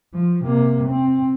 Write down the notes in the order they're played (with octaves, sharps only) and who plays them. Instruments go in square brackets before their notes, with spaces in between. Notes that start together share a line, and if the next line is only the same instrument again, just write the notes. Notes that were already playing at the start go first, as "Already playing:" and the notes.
[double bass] F3
C3 A#3
C4